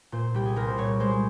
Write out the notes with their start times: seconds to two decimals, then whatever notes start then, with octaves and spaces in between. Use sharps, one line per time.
0.12 A#2 C5
0.34 C2 G4
0.46 G#4
0.56 C2 A#4
0.67 C5
0.78 A#2 C#5
1.00 G#3 C5